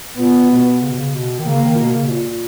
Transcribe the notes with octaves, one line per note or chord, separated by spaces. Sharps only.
A#2 B3
B2
C#3
B2
C#3
B2
D#3
C#3 A#3
D#3
A#2
B2
C#3
B2
A#2